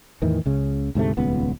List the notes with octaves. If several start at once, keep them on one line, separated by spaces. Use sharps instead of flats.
E2 A2 D#3 E3
C#2 C#3
D2 G#2 C3 A3
D#1 C#2 B3